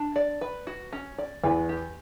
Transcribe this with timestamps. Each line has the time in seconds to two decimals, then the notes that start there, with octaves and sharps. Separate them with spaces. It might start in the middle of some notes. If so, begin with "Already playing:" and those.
Already playing: D4
0.16 D5
0.41 B4
0.67 F#4
0.92 C#4
1.18 D5
1.43 E2 B4
1.69 G4